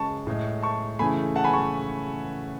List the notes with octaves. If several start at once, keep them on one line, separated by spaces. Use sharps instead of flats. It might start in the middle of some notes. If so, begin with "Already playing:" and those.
Already playing: C#3 G#3 A5 C#6
A2 G#3
A5 C#6
C#3 E3 A3 G#5 B5
F#5 A5
G#5 B5
A5 C#6